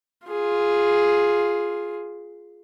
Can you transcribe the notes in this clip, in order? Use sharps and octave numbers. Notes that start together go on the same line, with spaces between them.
F4 G#4